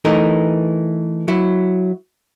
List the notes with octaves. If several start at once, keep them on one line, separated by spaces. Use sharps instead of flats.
E3 A3 D#4 A#4
F#3 E4